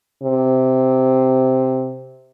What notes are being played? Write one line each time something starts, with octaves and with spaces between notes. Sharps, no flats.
C3